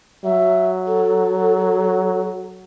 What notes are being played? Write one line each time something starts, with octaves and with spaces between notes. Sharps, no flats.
F#3 E5
A4